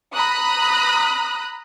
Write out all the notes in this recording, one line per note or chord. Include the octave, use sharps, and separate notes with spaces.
A#5 B5 D#6 F#6